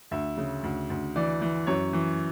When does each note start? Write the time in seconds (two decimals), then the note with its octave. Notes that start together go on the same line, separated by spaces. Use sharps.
0.11 D2 E5
0.37 C#3
0.63 D2
0.90 D2
1.16 E3 D5
1.41 E3
1.67 F#2 C#5
1.93 E3